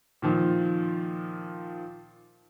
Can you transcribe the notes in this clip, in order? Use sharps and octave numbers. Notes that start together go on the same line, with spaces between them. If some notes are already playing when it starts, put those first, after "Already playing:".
A#2 D#3 F3